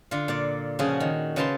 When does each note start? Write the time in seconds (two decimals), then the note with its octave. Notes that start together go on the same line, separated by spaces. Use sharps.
0.11 D3 F4
0.28 A#2 D5
0.79 C#3 F3 F#4 G#4
1.00 D#3
1.36 C#3 B4 A5 A#5 C6